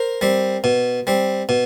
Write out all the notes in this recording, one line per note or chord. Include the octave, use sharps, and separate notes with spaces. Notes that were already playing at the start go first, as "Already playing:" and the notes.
Already playing: A#4 C5
G3 C4
B2
G3 C4
B2